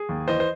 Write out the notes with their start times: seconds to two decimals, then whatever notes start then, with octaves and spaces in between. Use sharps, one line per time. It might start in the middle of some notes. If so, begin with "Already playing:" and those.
Already playing: G#4
0.09 D#2
0.28 E3 C5 D#5
0.40 C5